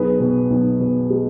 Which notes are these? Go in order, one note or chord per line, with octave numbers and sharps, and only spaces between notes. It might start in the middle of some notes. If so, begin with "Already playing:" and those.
Already playing: B1 G#4 B4
B2
B1
B2
G#3